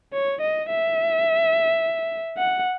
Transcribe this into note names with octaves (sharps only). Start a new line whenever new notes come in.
C#5
D#5
E5
F#5